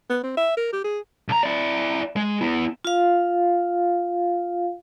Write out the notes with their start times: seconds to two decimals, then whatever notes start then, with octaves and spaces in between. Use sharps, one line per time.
0.10 B3
0.23 C4
0.37 E5
0.57 A#4
0.73 G4
0.84 G#4
1.28 B1 A#5
1.43 E4 D5
2.16 G#3
2.41 B3 E4
2.85 F4 F5